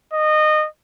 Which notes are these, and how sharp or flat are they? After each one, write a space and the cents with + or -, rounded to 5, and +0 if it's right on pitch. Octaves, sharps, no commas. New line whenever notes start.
D#5 -20